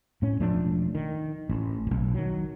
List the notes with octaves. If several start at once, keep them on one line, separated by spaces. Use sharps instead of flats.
A2 C#4
E1 F3 A3 D4
D#3
A1
E1 B1
D#3 F#3